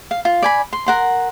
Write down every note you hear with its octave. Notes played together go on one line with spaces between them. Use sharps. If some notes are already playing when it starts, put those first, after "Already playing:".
F5
F4
D5 G#5 B5
C6
A#4 F#5 C6